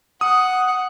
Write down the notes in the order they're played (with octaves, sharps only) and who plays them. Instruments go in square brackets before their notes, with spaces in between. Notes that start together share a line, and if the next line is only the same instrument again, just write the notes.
[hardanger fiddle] F#5 [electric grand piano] D#6